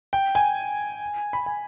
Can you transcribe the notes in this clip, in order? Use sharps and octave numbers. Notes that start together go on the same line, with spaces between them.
G5
G#5
B5
G#5